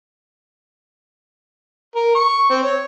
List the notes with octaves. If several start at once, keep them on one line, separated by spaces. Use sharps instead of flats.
A#4
C#6
C4
C#5